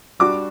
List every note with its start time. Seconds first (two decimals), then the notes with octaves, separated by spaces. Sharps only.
0.19 G3 D4 F#4 D6